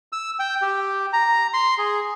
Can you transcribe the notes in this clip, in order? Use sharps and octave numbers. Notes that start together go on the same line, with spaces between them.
E6
G5
G4
A#5
C6
G#4